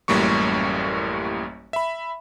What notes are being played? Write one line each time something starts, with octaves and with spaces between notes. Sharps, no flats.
A1 F#2 A2 G3 A#3 C#6
E5 B5